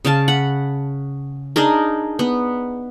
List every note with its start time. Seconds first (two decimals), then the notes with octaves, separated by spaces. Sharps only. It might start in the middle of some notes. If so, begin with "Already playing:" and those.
0.05 C#3 F5 A5
0.28 F#5 B5
1.56 D4 D#4 G#4 A#4
2.19 B3